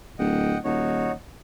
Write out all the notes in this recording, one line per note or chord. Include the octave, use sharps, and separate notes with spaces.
D1 D#5 F#5 G5
D#1 D#4 F#4 C#5